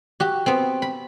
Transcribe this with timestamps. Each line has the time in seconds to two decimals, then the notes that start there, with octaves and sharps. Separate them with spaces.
0.20 F#4 G4
0.46 B3 C4
0.82 B5